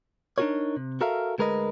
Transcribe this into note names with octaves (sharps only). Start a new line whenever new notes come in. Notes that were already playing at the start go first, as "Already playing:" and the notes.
D4 D#4 F4 F#4 A#4 C#5
C3
F#4 A4 A#4 E5 F5
D2 G#3 A#4 B4 D#5